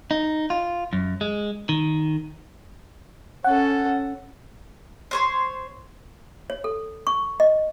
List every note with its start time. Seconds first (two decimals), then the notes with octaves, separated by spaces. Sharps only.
0.11 D#4
0.50 F4
0.93 F#2
1.21 G#3
1.69 D#3
3.44 C#4 A4 F#5
5.11 C5 C#5 C6
6.50 C#5
6.64 A4
7.07 C#6
7.40 D#5